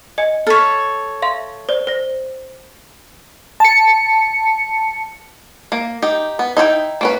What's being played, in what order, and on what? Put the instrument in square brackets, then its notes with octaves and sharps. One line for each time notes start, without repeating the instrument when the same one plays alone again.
[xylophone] D#5 G#5 C#7
[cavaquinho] A4 C#5 [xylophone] F6 B6
[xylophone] E5 F5 C6
C5 D5
C5 A#6
[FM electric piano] A5 C#7
[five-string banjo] A#3
D#4 G4
B3
D#4 E4 G#4 G5
A#3 C#4 B4